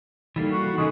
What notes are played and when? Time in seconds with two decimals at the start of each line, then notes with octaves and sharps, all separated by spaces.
0.36 E3 G3 A#3 D#4 A4
0.52 F#4
0.78 C#3 E3 G#3